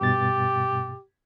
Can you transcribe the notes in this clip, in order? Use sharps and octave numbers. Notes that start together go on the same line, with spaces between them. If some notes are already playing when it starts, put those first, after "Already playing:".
G2 B2 G4 A6